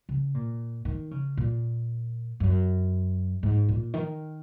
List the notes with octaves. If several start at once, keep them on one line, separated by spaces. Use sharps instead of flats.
C#3
A#2
D#3
C#3
A#2
F#2
G#2
A#2
D#3